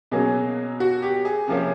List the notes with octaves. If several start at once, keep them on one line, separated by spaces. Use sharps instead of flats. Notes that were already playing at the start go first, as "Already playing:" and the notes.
B2 F#3 A#3 C#4 G#4
F#4
G4
G#4
C3 F3 A#3 C#4